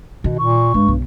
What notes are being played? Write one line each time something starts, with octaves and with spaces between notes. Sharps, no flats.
B2 D#3
A#2 C#6
G2 G#3
B1